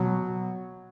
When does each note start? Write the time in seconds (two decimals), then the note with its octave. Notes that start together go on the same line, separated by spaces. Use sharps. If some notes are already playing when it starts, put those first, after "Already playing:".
Already playing: B2 F#3